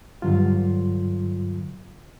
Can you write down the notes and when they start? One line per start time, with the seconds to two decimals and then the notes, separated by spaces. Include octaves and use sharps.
0.22 G2 D3 F#3 F4